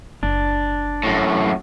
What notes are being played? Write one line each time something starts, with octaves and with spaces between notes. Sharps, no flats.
F#1 D4
F#2 A2